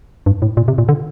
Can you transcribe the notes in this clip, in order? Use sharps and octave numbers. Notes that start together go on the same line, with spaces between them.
G2
A2
A#2
C3
A#2
D3